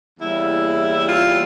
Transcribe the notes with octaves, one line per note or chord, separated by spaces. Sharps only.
E2 C#3 G3 A#3 E4
F4